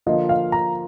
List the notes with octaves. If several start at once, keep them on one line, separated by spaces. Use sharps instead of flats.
D3 F3 A#3 F4 D#5
F5
A#5